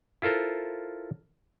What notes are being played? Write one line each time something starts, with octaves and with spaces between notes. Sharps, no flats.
E4 F4 A4 A#4 C5